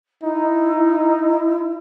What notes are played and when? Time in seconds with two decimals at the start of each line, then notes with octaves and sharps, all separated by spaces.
0.23 D#4 E4